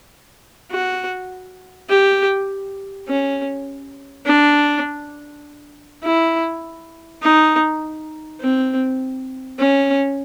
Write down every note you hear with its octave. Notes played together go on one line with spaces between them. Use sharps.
F#4
G4
C#4
D4
E4
D#4
C4
C#4